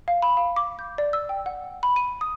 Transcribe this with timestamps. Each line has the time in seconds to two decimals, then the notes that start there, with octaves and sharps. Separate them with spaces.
0.08 F5
0.22 B5
0.37 F5
0.56 D6
0.79 G6
0.98 D5
1.13 E6
1.29 G5
1.46 F#5
1.83 B5
1.96 D#7
2.21 D#6